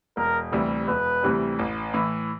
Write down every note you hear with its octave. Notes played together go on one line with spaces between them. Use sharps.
E1 A#4
D2 C3 E3 G3
E1 B4
D2 C3 E3 G3
A1
A2 E3